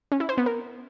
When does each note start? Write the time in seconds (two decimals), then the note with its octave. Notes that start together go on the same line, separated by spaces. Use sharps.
0.12 C#4
0.20 E4
0.29 C5
0.38 B3
0.46 A#4